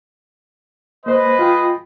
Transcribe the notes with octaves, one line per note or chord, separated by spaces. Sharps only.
G#3 A#3 B4 C5 D#5
F4 G5